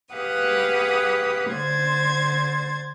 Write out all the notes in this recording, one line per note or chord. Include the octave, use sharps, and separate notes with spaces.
G4 G#4 B4 F5 F#5 D#6
D3 C5 G#6 A6